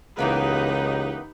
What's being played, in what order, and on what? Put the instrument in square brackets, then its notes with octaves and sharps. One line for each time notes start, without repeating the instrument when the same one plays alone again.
[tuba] C#2 [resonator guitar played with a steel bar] E3 A#3 B3 [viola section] D#4 G4 B4